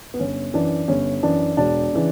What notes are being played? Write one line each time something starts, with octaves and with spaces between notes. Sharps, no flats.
B3
G1 C#4
F#2 E3 D4
G1 C#4
F#2 E3 D4
E1 D4
C#3 E3